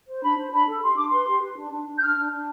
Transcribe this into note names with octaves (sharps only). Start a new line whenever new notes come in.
C5
D4 B5
C5
D4 B5
A4
G4 C6
D4 D6
B4 C6
G4
B4
D4
D4
D4
G6
D4 F6
D4
D4